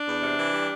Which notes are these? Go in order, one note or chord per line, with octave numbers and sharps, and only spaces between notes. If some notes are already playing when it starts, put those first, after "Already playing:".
Already playing: D4
E2
C3
E3
G3